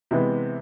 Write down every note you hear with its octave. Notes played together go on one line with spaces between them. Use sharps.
C3 E3 G#3 B3